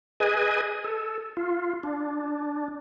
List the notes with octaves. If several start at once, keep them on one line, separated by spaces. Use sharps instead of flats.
G#4 B4 D#5 G#5
A4
F4
D4